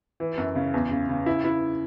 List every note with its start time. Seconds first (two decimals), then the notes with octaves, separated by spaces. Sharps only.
0.20 E3
0.38 F#2
0.55 C#3
0.74 E2
0.91 C#3
1.09 C#3
1.26 E4
1.44 E4